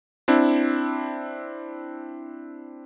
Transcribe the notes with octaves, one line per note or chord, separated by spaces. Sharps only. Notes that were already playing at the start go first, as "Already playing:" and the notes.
C4 D4 E4